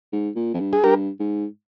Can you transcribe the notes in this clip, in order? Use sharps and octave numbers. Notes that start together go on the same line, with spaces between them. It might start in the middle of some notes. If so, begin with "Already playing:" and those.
G#2
A#2
F2
G2
G#4
G2 G4 A#4
G#2